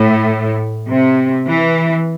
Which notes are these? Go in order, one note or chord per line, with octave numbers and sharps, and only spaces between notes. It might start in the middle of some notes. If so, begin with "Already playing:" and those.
Already playing: A2
C3
E3